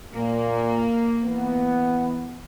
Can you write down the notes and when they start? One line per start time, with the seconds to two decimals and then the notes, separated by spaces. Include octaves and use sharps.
0.14 A#2 A#3
1.25 E3 B3